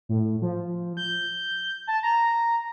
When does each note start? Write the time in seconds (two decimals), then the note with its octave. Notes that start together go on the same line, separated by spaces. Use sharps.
0.09 A2
0.42 F3
0.97 G6
1.87 A5
2.03 A#5